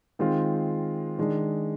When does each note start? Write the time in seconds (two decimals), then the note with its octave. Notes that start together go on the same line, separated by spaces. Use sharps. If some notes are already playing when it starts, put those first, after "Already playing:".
0.19 D#3 G#3 C4 F4
1.18 D#3 G#3 D4